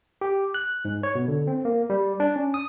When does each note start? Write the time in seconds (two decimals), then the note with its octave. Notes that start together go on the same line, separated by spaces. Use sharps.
0.21 G4
0.54 F#6
0.85 G#2
1.03 C#5
1.15 B2
1.28 D3
1.47 C4
1.65 A#3
1.90 G3
2.20 D4
2.36 C#4
2.54 D#6